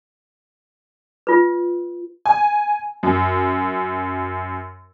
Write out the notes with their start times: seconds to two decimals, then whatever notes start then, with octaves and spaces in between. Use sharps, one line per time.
1.27 F4 B4
2.26 G#5
3.03 F#2